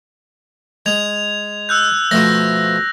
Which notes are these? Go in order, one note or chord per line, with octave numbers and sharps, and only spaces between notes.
G#3 G#6 F7
E6 F#6 G6
B2 F3 A3 A#6